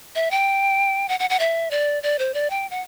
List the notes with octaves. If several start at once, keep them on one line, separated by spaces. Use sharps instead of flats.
E5
G5
F#5
F#5
F#5
E5
D5
D5
C5
D5
G5
F#5